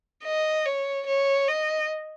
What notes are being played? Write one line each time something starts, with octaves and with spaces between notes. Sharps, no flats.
D#5
C#5
C#5
D#5